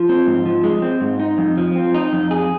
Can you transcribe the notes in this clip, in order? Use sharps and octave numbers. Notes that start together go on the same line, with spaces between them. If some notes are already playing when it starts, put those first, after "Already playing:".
Already playing: F3
C4
G#2
F3
G#3
C4
G#2
D#4
F2
F3
C4
D#4
F2
G#4